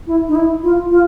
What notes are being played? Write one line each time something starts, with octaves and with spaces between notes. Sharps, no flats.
E4
D#4
E4
F4
F4